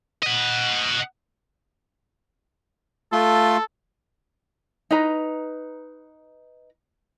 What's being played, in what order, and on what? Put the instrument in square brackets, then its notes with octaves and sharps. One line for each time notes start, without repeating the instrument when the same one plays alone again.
[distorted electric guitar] D#5 F#5
[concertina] A3 F4 C6 [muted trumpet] A4
[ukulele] D#4 B4 A#5